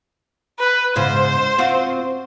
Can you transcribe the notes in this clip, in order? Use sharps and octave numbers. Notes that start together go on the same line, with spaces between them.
B4
E2 G#2 C#3 C5
C4 F4 F#4